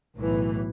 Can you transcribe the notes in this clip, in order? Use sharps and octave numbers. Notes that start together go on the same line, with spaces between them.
B1 A2 E3